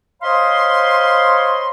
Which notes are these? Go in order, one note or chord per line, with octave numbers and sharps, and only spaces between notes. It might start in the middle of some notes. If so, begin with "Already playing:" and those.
C5 C#5 D#5 F5 B5 C6